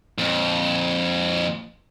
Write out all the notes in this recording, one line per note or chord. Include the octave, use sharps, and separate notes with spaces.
F2 A#2